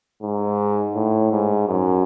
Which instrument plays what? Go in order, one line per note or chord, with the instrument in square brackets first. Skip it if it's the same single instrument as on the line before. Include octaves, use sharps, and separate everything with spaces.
[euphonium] G#2
A2
G#2
F#2